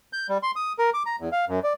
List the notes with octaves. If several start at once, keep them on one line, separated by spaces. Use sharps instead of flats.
G6
G3
C6
D#6
A#4
D6
A#5
E2
F5
F#2
D5